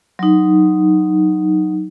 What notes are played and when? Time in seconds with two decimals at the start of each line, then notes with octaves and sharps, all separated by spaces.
0.19 F#3 D#4